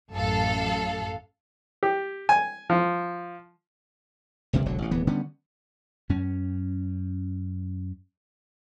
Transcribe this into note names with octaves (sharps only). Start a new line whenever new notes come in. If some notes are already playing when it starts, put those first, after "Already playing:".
A1 F#2 A4 F5
G4
G#5
F3
F#1 C#2 C3 A#3
E1 B1 D3 F#3
A1 A#2
D1 E3 B3
D3 G3 B3 C#4
F#2 C#4